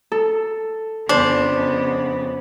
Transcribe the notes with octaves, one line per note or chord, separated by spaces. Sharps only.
A4
F2 C#3 B3 D4 C5